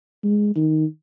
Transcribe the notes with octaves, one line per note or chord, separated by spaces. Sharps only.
G#3
D#3